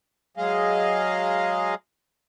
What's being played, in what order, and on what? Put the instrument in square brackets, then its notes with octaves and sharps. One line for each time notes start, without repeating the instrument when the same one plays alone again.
[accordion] F#3 G#3 G#4 D#5 F5